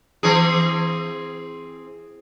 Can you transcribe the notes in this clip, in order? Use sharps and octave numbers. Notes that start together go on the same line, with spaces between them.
E3 C4 G#4